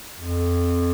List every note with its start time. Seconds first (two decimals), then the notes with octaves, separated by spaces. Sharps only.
0.17 F2